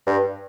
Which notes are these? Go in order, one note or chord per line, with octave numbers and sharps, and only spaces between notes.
G2